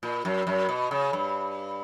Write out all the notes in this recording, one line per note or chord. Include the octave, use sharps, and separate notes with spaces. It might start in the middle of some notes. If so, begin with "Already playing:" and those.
A#2
F#2
F#2
B2
C#3
G2